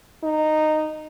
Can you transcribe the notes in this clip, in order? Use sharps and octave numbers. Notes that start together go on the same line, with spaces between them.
D#4